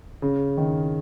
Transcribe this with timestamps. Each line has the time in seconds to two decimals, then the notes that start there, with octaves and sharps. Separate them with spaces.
0.22 C#3
0.57 D#3